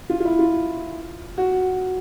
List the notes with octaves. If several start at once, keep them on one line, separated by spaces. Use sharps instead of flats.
F4
F4
E4
F4
F#4